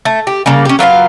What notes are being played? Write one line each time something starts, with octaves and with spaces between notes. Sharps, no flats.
A3
G4
C#3 G3 A#3
C#4 G4
F#3 F4 B4 F5